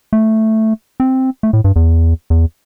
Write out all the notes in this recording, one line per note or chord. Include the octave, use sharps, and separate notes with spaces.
A3
C4
A3
A2
G2
E2
E2